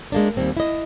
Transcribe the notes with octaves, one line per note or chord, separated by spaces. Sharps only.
G#3 A#3 D4
D#2 G3 C4
E4 D#5